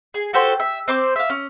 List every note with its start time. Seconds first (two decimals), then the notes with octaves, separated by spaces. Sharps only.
0.14 G#4
0.33 F#4 G4 A4 C5
0.60 E5
0.88 C4 C5 D6
1.16 E5 F5
1.30 C#4